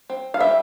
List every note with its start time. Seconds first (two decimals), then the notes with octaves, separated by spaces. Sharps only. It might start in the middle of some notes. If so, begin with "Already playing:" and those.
0.10 C4
0.34 F5
0.40 G3 E5